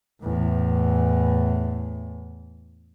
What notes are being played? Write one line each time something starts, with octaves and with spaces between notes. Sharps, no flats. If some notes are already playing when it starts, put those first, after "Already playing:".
E2 A2